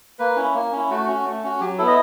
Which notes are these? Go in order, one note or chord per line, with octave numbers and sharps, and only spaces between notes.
A#3 B4
C#4 E4
A#3
C#4 E4
A3 F#4
C#4 F#4
A3
C#4 F#4
F#3 G4
B3 E4 A4
D#5